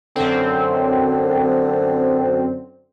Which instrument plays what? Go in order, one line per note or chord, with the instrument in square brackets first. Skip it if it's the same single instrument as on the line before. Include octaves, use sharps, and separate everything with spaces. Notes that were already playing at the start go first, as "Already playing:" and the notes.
[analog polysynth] F#2 C4 [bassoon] D3